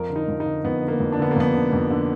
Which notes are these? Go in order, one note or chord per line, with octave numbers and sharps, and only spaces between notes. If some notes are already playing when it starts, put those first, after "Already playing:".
Already playing: F2 A#4
D3
D#4
F2
D#4
D3
F2 B3
D3
A#3
F2
D4
D3 B3
A#3
F2 B3
D3
F2
D3